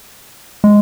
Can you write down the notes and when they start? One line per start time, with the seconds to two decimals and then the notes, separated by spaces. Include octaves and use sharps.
0.64 G#3